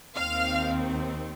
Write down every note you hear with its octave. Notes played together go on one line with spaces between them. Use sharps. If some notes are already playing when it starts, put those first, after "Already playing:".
D#2 D#3 C4 F5